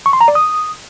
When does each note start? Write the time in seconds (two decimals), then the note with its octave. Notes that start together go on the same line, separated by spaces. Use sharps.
0.06 C#6
0.13 C6
0.21 A#5
0.28 D5
0.35 D#6